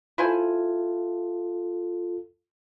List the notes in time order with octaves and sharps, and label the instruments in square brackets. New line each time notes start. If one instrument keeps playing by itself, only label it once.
[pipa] E4 C5 G#5 [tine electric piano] F4 A4